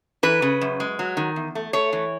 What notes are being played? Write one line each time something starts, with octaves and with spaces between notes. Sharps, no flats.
E3 B4
C#3
F#2
G#3
F#3
D#3
E2
A3
A3 C#5
E3